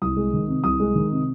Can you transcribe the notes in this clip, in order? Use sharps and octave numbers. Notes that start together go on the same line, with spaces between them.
C2 D#6
G#3
D#3
C3
C2 D#6
G#3
D#3
C3